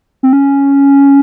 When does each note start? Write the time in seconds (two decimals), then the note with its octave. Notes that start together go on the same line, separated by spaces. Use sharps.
0.23 C4
0.33 C#4